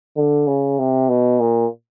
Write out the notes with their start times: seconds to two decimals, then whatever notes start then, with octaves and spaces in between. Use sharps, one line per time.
0.17 D3
0.48 C#3
0.79 C3
1.09 B2
1.40 A#2